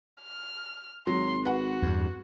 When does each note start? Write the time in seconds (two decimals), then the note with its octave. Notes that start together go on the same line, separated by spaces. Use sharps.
0.22 F6
1.07 G#1 F#3 C6
1.45 F#4 B4 F#5
1.82 E2 G2